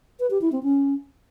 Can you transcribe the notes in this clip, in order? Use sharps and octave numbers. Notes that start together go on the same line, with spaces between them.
B4
G4
E4
C4
C#4